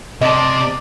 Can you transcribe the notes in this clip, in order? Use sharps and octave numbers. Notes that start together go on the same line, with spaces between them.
C3 D5 D#5 A5